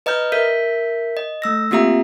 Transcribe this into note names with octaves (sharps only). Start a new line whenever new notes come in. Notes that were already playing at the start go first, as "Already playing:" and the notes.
B4 D#5 A#5 F6 G6
A#4 E5 G6 B6
D#5
A3 E6 A#6
A#3 C4 F4 G4 E5 A#5